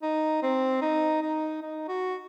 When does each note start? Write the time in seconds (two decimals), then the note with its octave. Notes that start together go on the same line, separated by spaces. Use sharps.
0.02 D#4
0.42 C4
0.81 D#4
1.22 D#4
1.62 D#4
1.88 F#4